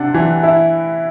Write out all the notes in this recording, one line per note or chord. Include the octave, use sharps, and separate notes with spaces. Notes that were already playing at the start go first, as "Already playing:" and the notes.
Already playing: C3 D4 F#5
E3
E4